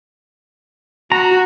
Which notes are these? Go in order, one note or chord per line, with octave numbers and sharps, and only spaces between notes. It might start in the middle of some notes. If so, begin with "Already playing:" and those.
F#4 A#5